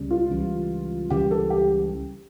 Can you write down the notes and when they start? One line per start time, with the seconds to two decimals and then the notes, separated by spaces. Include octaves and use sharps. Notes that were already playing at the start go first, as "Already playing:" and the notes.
Already playing: C#2 C#3 G3
0.11 F4
0.31 C#2 C#3 E3 G3
1.10 C#2 C#3 E3 G3 G4
1.31 A4
1.50 G4